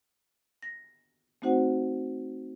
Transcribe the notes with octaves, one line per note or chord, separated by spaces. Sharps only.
A#6
A3 C4 D#4 F#4 C5 F#5